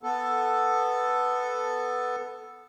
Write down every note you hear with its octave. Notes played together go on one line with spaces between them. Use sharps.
B3 A4